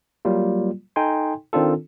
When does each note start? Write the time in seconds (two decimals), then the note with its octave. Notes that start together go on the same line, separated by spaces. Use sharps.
0.25 F#3 G3 A#3 F4
0.96 D#4 A4 G5 G#5 C6
1.53 D#3 C4 D4 F4 A4